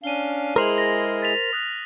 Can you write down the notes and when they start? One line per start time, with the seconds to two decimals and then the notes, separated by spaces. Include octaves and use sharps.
0.04 C#4 D4 F5 D#7 G7
0.56 G#3 E4 G#4 A#4 C5 F6 F7 F#7
0.78 A#6
1.22 A6 B6 F7
1.53 D#6 F#6